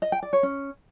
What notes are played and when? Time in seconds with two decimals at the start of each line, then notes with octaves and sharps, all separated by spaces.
0.02 D#5
0.12 G5
0.23 D5
0.33 C#5
0.43 C#4